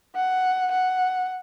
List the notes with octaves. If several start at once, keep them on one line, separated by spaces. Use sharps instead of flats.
F#5
F#5